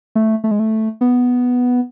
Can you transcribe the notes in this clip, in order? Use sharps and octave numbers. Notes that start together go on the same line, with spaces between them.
A3
A3
G#3
A3
B3